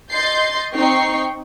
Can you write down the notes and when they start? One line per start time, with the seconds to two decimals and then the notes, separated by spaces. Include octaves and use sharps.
0.11 D#5 C6 G6 A6 C7
0.74 C4 D#4 G5 C#6 C7